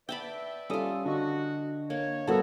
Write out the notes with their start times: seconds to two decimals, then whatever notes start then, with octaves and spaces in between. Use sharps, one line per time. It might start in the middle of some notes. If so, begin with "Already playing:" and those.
0.09 B4 D5 E5 G5 A5 B5 G6
0.70 G3 C#4 F4 A4 D#6
1.05 D3 D4 F#4 D#5
1.90 A#3 C#5
2.27 G3 B3 F#4 A4 A#4 C#5 A5 E6